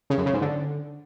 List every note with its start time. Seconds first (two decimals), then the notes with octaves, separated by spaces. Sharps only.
0.10 C#3
0.18 F#2
0.26 C#3
0.33 G#2
0.41 D3